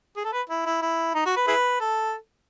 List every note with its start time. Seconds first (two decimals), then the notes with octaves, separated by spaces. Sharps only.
0.17 G#4
0.25 A4
0.33 B4
0.49 E4
0.66 E4
0.82 E4
1.15 D#4
1.26 F#4
1.37 B4
1.47 E4 G#4 B4
1.80 A4